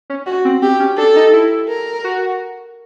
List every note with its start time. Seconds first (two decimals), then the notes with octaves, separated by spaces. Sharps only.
0.10 C#4
0.26 F#4
0.45 C4
0.62 C4 G4
0.80 C#4
0.98 D4 A4
1.16 D#4
1.33 E4
1.69 A#4
2.04 F#4